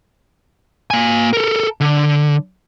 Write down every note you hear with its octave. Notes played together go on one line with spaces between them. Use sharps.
A#3 G#5
A4 A#4
D3